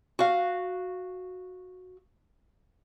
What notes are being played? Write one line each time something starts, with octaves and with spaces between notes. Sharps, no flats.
F#4 F5